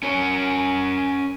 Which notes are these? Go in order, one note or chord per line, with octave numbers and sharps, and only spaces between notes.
C#4 A#4 C#5